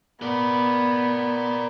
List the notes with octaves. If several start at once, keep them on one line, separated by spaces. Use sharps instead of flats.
B3 A#4 D5